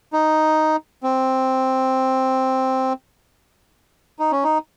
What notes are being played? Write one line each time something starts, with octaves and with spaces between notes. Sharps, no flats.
D#4
C4
D#4
C#4
D#4